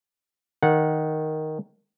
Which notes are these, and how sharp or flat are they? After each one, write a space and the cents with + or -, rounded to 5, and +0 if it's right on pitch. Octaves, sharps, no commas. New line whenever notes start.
D#3 +0 F#5 -15